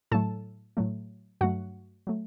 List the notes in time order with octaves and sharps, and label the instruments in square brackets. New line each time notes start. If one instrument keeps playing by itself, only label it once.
[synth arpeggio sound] A2 F#3 A3 A4 A5
A2 F#3 A3
G2 F#3 A3 F#4 F#5
F#3 A3